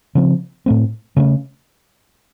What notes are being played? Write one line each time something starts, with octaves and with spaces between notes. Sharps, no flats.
C#3 F3 C4
A2 A3 C4
C#3 A3 C#4